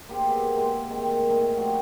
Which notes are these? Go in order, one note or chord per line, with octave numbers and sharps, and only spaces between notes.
A#3 G4 G#4 C5
B3 G4 E5
G#3 A#3
D#3 C4 D6
A2 E4 A#4 D#5
F3 G3 F#4